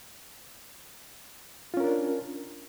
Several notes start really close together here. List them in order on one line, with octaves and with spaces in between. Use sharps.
F4 C#4 A#4 D4